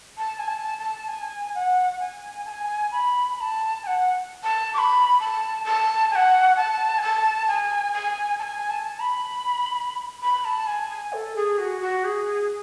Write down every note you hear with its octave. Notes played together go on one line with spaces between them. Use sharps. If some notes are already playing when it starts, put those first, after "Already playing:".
A5
G#5
A5
A5
G#5
F#5
G#5
A5
G#5
B5
B5
A5
G#5
F#5
A5
D6
B5
A5
A5
G#5
F#5
A5
G#5
A5
G#5
G#5
A5
G#5
A5
B5
B5
A5
G#5
G#5
A4
G#4
F#4
F#4
G#4